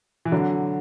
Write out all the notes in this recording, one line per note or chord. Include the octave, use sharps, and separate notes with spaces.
E3
D3 F#3